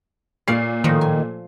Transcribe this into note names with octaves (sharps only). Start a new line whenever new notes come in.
A#2 C#5 D5 F5 C7
A2 D#3 F3
G#5